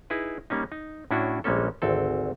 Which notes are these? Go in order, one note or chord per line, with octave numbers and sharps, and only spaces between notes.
D#4 E4 G#4 B4
G3 A#3 C#4 D#4
D#4
A2 C#4 D4 E4 F#4
A#1 G3 G#3 A#3 C#4 A4
G#1 D2 C4 A4